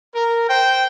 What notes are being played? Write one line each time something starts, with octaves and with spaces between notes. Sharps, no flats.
A#4
C5 G5